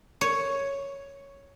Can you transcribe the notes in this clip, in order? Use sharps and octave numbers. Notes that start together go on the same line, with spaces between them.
C#5